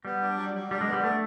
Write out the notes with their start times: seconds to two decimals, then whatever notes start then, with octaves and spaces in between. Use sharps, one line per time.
0.05 G3 B3
0.22 D4
0.37 F#3
0.54 F#3
0.71 G3 D4
0.81 G#3
0.87 B3
0.92 G3
1.04 A3 D4